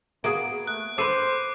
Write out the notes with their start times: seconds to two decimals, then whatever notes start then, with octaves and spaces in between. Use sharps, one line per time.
0.24 A#3 B3 F#4 G#4 D7
0.67 A3 F#6
0.98 A4 B4 C5 D6 C7 D#7